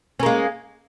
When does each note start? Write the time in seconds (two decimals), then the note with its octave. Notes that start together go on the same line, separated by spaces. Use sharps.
0.20 C#4
0.23 A#3
0.26 G#3